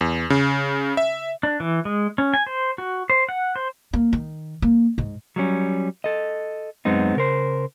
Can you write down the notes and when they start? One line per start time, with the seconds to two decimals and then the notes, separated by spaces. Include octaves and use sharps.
0.01 E2
0.30 C#3
0.97 E5
1.43 D4
1.60 E3
1.85 G#3
2.18 C#4
2.34 G#5
2.46 C5
2.78 F#4
3.10 C5
3.29 F#5
3.56 C5
3.93 A#3
4.13 D#3
4.62 A#3
4.98 G#2
5.36 F#3 G3 C#4
6.04 A4 D#5
6.85 F#2 G#3 B3 C4 D#4
7.16 C#3 A#4 C5